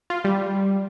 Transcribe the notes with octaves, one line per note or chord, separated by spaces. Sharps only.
F4
G3